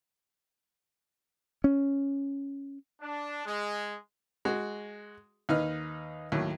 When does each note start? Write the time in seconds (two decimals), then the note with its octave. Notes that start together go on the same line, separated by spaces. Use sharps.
1.64 C#4
3.01 D4
3.45 G#3
4.45 G#3 F#4
5.49 D#2 D#4 B4 D#5 F6
6.32 D#2 A2 F#3